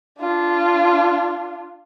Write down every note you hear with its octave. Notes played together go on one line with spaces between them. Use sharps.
D4 F4